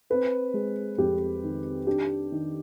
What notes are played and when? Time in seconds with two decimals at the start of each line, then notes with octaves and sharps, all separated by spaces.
0.10 C4 B4
0.54 G#3
0.98 F2 G4
1.43 D#3
1.87 D4 G4
2.32 D#3